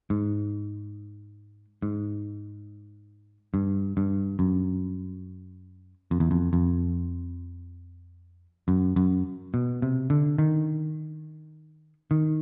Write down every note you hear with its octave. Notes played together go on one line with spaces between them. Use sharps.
G#2
G#2
G2
G2
F#2
F2
E2
F2
F2
F#2
F#2
B2
C3
D3
D#3
D#3